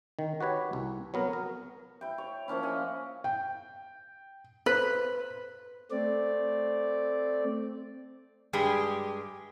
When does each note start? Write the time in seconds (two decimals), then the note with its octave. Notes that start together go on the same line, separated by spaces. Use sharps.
0.19 D#3
0.41 F#4 G4 B4 C#5
0.73 C2
1.14 F#3 B3 A#4
1.33 A#4
2.01 E4 G5
2.18 C#5
2.48 F3 A#3 C#4 E4
2.63 D#5 F#5 G#5
3.24 G5
4.66 B4 C5
5.91 A3 C4 D5
8.53 G2 G#3 G4 G#4